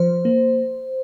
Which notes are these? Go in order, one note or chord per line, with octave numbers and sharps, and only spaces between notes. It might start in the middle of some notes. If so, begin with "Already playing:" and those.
Already playing: F3 C5
A#3